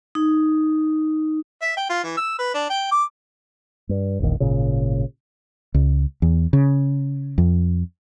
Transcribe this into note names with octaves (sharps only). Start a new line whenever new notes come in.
D#4
E5
G5
F4
E3
E6
B4
D4
G5
D6
G2
E1 A#1 D#3
G#1 A#2 C#3
C#2
E2
C#3
F2